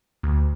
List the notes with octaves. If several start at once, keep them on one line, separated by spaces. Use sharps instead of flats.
D2